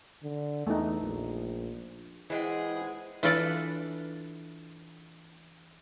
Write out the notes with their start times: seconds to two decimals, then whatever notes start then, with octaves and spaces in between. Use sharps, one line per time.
0.23 D3
0.67 E2 A3 D#4
1.00 A#1
2.30 E3 G#3 E4 G#4 C5 F#5 G5
3.23 E3 D4 F4 A4 B4 D5